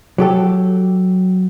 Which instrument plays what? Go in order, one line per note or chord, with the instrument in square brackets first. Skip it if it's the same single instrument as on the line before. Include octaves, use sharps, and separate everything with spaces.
[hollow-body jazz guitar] F#3 G4 A4